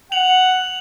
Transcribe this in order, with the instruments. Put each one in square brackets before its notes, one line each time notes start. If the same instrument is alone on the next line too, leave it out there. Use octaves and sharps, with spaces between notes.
[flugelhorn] F#5 [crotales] F7 F#7